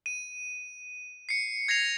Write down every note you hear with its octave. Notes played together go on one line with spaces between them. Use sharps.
D#7
C7 C#7
G#6 A#6 C7 F7